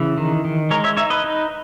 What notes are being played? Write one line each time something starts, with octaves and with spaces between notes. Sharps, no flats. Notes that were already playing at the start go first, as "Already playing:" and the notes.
Already playing: C#3 E3
D#3
D#3
G#3 A#4 C#5
C#5 E5
D#4 C#5 E5
B4 D#5
D#4